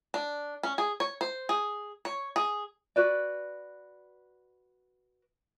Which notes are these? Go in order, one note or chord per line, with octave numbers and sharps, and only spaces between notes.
D4
C#4
G#4
C#5
C5
G#4
C#5
G#4
F#4 B4 D5